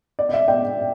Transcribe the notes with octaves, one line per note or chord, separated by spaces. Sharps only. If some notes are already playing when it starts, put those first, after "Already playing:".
D5
D5
E5
D5 G5